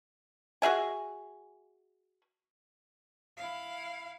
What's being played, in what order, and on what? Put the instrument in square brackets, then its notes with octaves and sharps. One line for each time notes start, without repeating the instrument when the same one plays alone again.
[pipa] F#4 G#4 E5 G#5
[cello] E4 F5